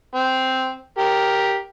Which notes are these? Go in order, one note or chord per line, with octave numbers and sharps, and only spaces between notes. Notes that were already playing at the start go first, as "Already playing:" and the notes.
C4
G4 A#4